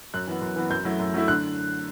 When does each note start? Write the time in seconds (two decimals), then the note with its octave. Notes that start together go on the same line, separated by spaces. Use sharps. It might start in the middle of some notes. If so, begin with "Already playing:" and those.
0.14 F#2 F#6
0.28 E3 B3
0.42 F#2
0.56 E3 B3
0.70 F#2 G6
0.85 F#3 A3 E4
0.99 F#2
1.14 F#3 A3 E4
1.28 D3 F#6